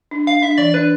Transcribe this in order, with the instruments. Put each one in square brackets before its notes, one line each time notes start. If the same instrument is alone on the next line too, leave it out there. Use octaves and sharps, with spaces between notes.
[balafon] D4
[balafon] D4 [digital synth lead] F5
[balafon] D4 [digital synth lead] E5
[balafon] E3 [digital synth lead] D5
[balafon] D4 [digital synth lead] B4